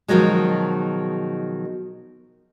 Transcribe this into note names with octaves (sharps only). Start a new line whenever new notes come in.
B2 D#3 F3 F#3 G#3